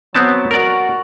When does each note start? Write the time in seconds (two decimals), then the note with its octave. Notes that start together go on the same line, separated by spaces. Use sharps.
0.15 F#3 B3 C4 A5
0.51 F#4 A#4 D5